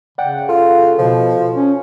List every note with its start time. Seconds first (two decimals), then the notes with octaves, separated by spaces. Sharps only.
0.18 C#3 D5 F#5 G5
0.49 F4 A4
0.98 B2 F3
1.56 C#4